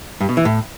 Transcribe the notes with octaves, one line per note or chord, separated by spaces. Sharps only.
G2
B2
E3
A2